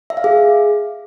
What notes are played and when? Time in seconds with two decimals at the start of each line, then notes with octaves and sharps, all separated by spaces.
0.10 E5
0.17 F5
0.24 G#4